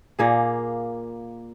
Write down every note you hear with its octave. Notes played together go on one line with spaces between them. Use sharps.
A#2 A#3 G#4